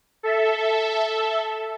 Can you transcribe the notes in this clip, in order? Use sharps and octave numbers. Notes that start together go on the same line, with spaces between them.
A4 E5